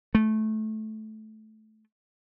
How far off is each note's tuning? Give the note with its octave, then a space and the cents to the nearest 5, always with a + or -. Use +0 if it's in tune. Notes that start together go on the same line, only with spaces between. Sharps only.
A3 -15